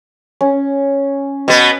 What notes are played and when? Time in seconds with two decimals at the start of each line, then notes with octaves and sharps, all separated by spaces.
0.41 C#4
1.48 B2 B3